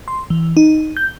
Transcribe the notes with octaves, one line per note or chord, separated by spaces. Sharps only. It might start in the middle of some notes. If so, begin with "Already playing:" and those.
C6
E3
D#4
G6